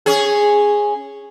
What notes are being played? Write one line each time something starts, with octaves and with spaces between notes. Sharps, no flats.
C#4 G#4